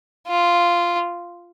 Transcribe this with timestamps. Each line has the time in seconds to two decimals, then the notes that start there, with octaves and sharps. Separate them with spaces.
0.28 F4